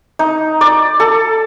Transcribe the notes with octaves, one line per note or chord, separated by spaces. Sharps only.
D#4
D5
A4